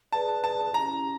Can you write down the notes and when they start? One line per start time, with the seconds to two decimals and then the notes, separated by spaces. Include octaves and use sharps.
0.12 G#4 B4 D5 A5
0.44 A5
0.74 C#4 E4 G4 A#5